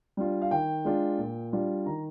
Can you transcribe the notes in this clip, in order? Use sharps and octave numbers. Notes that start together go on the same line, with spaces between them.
G3 D4 F4
F5
D#3 G5
G#3 D4 F4
A#2
G3 D4 F4
D#3 A#5